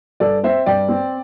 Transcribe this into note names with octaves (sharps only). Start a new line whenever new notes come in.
G2 A4 D5
C4 C5 E5
G2 D5 G5
C4